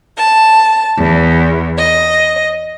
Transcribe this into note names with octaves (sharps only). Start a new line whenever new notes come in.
A5
E2
D#5